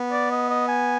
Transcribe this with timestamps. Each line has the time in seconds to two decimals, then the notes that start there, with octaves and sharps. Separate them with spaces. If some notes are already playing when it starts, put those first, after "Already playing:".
Already playing: B3
0.12 D5
0.31 D#5
0.50 D#5
0.68 G#5